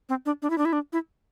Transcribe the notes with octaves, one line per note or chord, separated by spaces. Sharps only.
C4
D4
D4
E4
D4
E4
D4
E4